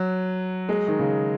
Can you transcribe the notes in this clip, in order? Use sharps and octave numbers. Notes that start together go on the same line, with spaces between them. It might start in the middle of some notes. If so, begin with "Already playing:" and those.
Already playing: F#3
G#3
D#3
C#3